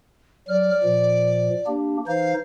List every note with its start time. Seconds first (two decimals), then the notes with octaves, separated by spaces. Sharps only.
0.48 F#3 D5 F6
0.83 A#2 F3
1.67 A#3 D4 G4
2.07 E3 D#4 C5 F5